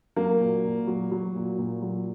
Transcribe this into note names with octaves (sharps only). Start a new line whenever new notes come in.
F#3 A#3
A#2
A#2
F#3
F#3
A#2
A#2
F#3